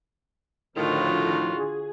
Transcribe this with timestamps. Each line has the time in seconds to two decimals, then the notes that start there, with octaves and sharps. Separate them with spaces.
0.77 A2 D3 D#3 F3 F4 F#4
1.57 G#4